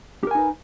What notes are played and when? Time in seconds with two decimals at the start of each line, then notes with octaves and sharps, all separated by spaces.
0.23 G4
0.27 A#4
0.31 G#5
0.35 D#4
0.39 B4